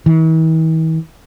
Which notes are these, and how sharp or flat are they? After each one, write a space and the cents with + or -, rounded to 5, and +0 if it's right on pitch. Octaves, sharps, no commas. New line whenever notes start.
E3 -45